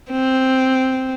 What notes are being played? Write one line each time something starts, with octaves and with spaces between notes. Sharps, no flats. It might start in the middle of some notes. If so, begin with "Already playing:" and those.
C4